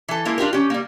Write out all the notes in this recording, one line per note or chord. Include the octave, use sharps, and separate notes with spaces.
E3 A4
G#3 A#3 E4
D4 F4 G4 A#4
C#4 G4
G3 A#3